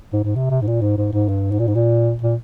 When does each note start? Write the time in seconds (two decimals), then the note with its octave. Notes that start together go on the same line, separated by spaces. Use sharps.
0.13 G#2
0.24 G#2
0.35 C3
0.51 C3
0.61 G#2
0.67 A#2
0.81 G#2
0.98 G#2
1.13 G#2
1.28 G2
1.52 G#2
1.59 A#2
1.67 G#2
1.75 A#2
2.21 A#2